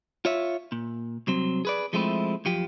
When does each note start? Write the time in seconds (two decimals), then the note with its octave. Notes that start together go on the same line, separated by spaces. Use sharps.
0.25 F4 C#5 E5
0.72 A#2
1.27 C2 F#3 C4
1.65 G#4 B4 D5
1.93 F3 G#3 A3 C4 E4
2.45 F#2 F3 G4